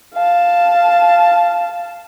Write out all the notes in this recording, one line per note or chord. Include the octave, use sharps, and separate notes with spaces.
F5 A5